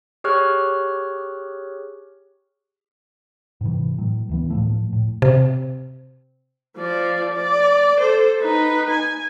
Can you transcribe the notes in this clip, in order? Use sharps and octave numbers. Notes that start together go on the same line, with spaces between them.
G4 G#4 C#5 C#6 F6 F#6
G#2 C3 E3
A2 F#3
D2 E3 B3
A2 F3 A3
A2
C3
F3 D5
D5
A4 C5
D#4 B4
G#5